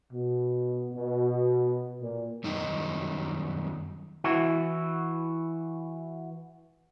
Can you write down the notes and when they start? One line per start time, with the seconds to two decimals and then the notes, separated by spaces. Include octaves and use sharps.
0.12 B2
0.93 B2
2.02 A#2
2.44 F#2 D#3 G3 D#4
4.24 E3 E4 F#4